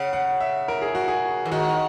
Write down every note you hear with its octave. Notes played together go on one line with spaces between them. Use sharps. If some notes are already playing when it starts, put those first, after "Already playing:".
Already playing: C#3 F#5
F#5
E5
A#4
G#4
F#4
G#4
E3
D#3 F#4